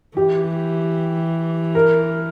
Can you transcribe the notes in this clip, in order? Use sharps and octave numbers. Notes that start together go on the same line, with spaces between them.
E3 G4
A#4